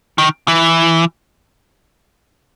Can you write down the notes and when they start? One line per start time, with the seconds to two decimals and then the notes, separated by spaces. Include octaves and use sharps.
0.18 D#3
0.48 E3